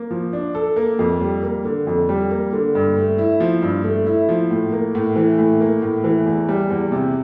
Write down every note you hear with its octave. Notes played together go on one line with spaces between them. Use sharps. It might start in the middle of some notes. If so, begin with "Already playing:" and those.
Already playing: A#3
F3
D4
A4
A#3
F2
G3
A#3
D3
F2
G3
A#3
D3
G2
A3
E4
F3
G2
A3
E4
F3
A2
A#3
A2
E3
A2
A#3
A2
E3
E2
G3
E2
C3